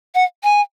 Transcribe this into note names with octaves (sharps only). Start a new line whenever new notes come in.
F#5
G#5